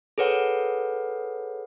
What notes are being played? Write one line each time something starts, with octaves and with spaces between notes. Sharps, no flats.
G#4 A4 B4 C#5 F#5